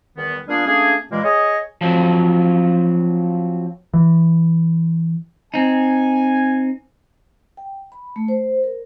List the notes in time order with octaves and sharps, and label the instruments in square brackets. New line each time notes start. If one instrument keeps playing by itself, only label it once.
[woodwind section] E2 D#3 G3 B3
A#2 G3 A#3 B3 D4 G#4
A3 A#3 C#4 D4 G#4
G2 A#2 E3 G3 G#3 A#3
G#4 C#5 D#5
[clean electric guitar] F3 F#3 C4
[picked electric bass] E3
[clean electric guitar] C4 D#4 [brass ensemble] G#5
[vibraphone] G5
B5
A3
C5
A#4